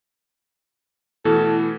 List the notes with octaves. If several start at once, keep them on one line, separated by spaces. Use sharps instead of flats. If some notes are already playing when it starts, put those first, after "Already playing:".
B2 E3 A3 E4 A4